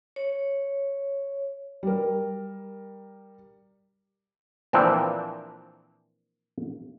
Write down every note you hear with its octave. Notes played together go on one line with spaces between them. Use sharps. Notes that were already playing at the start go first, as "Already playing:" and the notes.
C#5
G3 A#4
A#2 E3 F3 A#3 C4 D4